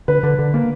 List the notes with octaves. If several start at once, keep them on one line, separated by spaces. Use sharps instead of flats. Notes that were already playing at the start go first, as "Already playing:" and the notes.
D3 B4
D3
D3
A#3